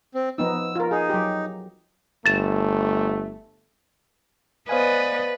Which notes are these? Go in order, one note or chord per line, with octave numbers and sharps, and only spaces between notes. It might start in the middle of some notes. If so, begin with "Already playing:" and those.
C4
F3 B3 D#4 E6
F4 A#4
D#4 G#4
F#3 G4
G1 A3 A6 E7
B3 B4 C5 D5 D#5 F5 G#5